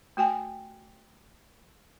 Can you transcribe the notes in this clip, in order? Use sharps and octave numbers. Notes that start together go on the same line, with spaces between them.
A3 F#4 G5 G#5